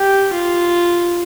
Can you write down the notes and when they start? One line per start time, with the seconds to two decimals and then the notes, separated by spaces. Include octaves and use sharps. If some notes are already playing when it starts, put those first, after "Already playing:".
Already playing: G4
0.33 F4